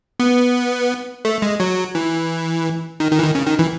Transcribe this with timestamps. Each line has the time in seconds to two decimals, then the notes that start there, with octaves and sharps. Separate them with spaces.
0.20 B3
1.25 A3
1.42 G#3
1.60 F#3
1.95 E3
3.00 D#3
3.12 D#3
3.19 E3
3.23 D#3
3.35 C#3
3.47 D#3
3.59 E3